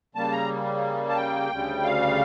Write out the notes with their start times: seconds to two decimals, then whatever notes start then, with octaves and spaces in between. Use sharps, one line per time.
0.15 C#3 G3 A#3 A5
0.32 A#5
1.09 A5
1.16 G5
1.51 D2 C#3 G3
1.84 F5